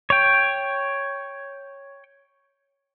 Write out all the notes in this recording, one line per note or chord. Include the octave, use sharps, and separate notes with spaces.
C#5 G5